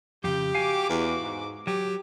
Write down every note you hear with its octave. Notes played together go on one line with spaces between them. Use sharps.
F2 C#3 G4 G6
F#4 F5 G#5 D6
E2
G#2
F#3 G4